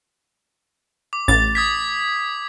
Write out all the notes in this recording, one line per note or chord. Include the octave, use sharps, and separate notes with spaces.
D6
A1 A6
D#6 G#6 B6